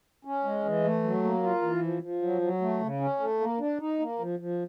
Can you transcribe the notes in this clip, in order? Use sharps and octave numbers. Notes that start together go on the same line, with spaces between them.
C#4
G#3
E3
A3
F#3
A#3
F4
E3
F3
F3
F#3
F#3
A3
C#3
C#4
A3
A#3
D4
D#4
A#3
F3
F3